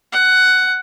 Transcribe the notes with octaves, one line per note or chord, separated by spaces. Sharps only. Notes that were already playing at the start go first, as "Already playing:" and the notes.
F#5